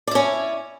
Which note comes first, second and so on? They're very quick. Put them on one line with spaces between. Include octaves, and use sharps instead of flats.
D5 E4 C#4